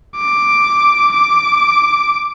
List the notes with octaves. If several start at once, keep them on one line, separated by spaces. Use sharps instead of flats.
D6
D6